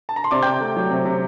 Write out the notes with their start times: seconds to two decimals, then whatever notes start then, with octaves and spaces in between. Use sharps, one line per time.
0.09 A5
0.16 A#5
0.24 C6
0.31 C3 D5 D6
0.42 G5 G6
0.46 C3
0.60 A3
0.76 F#3
0.91 C3
1.06 C3